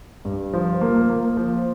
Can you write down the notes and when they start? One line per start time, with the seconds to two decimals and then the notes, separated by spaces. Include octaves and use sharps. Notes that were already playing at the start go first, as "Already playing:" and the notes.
0.25 G2
0.53 F3
0.81 A#3
1.09 A#3
1.37 F3